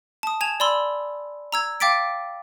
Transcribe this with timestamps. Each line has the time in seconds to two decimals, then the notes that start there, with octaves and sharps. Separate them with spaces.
0.23 A5 D#6
0.41 G#5 G#6 E7 F7
0.60 D5 B5 C6 E6
1.52 A#5 E6 G#6
1.80 F5 G5 D6 A6 B6 D7